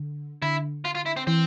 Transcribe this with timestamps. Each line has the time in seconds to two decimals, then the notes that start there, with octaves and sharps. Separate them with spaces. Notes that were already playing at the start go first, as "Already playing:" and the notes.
Already playing: D3
0.42 D3 E4
0.85 F4
0.95 F4
1.06 E4
1.17 C4
1.27 E3 C4